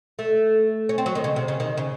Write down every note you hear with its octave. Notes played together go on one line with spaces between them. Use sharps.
A3
C#4
C4
F#3
D#3
C#3
C3
C#3
D#3
C#3